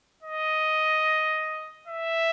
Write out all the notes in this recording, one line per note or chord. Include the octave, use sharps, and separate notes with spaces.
D#5
E5